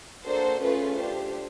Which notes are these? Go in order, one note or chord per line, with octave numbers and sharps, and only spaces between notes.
A#3 D4 F#4 A4 C5
A3 C#4 F4 G#4 B4
D4 G4 C5